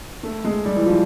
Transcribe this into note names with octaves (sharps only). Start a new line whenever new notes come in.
A3
G#3
G3
E3
F3